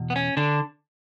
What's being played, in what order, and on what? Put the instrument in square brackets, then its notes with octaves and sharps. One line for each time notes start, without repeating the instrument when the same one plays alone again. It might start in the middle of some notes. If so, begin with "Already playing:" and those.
Already playing: [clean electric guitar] E2 B2
B3
C#4
D3 D4